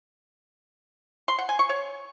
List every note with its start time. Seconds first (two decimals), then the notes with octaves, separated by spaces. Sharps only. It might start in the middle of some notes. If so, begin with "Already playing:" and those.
1.28 C6
1.38 F#5
1.49 G#5
1.59 C#6
1.69 C#5